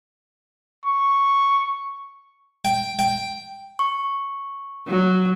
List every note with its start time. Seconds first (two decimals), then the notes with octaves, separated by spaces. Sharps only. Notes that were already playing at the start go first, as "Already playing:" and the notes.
0.86 C#6
2.65 G5
2.99 G5
3.79 C#6
4.88 F#3